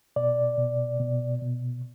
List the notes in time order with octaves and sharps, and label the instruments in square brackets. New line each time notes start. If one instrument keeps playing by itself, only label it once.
[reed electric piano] B2 D5
B2
B2
B2